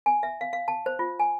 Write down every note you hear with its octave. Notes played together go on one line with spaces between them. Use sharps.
G#5
E5
F5
F5
A5
C5
F4
G#5